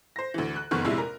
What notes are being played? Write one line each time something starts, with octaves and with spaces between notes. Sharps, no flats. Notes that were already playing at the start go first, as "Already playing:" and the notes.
C5 A#6
D2 E3
F#6
F#1 F2 D#3 B3 C#6 F6
F1 A#1 C3 G#3 E4
A#4